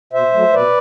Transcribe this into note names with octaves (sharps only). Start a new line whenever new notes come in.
B2 C5 E5
F#3 A3
B2 B4 D5